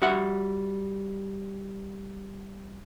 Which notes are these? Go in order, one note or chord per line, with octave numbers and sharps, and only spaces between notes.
G3 F#4 E5 F#5